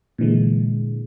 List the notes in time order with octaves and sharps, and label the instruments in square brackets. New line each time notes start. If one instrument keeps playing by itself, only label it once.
[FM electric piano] A#2 D3 E3 G#3